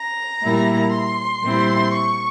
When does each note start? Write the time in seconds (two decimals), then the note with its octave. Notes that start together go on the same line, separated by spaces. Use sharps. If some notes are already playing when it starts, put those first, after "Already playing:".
Already playing: A#5
0.41 A#2 G3 A#3 E4
0.91 C6
1.41 A#2 G3 C4 E4
1.92 C#6